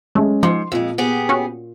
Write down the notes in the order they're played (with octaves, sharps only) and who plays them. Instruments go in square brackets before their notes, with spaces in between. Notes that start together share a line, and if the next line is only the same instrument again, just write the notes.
[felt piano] G#3 C#4 [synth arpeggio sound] A3
[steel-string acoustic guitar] G#2 [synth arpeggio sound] F3 [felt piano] C6
[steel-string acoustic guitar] F2 G#3 [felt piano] A#2
[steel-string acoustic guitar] B3 G4 G#4
[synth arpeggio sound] C#4 F#4